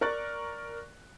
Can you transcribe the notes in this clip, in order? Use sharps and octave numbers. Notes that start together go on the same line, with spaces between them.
A#4 D5 C#6 F#6 A6